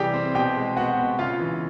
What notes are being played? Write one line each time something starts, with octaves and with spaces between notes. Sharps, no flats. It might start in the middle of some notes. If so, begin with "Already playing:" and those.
Already playing: C3 E3 G3 G4 G#4 G5
C4
B2 G4 G5
G#3
B3 F#4 F#5
B2
C#3 F4 F5
E3